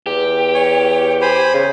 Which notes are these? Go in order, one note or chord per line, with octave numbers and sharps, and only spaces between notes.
E2 G4
C#5
C5 G#5 B5
C#3